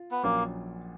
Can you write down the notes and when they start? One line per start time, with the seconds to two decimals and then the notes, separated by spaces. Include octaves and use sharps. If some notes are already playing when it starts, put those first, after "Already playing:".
Already playing: F4
0.11 B3
0.23 A#1 A#2 F#3 A#3 C#4